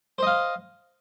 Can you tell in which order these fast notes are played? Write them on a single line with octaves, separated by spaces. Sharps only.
C5 D#5 F5